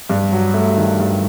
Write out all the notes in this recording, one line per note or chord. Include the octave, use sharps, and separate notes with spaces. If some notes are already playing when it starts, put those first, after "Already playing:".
G2
F#3
A3
D#3
G2